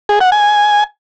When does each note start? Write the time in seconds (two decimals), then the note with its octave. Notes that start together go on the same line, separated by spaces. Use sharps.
0.09 G#4
0.21 F#5
0.32 G#5